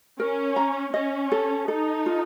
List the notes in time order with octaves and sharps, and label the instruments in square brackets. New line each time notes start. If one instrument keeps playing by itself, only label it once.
[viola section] C#4 [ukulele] A#4
[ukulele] A#5
[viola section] C#4 [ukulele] D#5
[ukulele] A4
[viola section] D#4 [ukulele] A4
[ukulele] F4